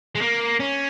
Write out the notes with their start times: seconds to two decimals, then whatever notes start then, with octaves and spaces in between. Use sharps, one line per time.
0.15 G#3
0.21 A#3
0.60 C#4